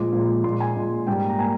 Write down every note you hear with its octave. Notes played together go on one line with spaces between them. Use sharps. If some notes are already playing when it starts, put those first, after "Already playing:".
Already playing: A#2 F3 G#3 D6
A#2 F3 G#3
A#2 G#3 C6
G#5
A#2 G#3
G#2 G3 A#3 G5
A#5
G3 A#3 G#5